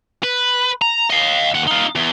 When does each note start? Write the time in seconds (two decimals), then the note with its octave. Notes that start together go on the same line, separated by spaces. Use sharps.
0.24 B4
0.82 A#5
1.10 D#5 F5
1.55 D#2 F#5
1.67 D#4 F4
1.96 E2